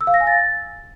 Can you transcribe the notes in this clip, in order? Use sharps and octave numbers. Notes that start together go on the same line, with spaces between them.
E6
F5
A#6
G#5
A6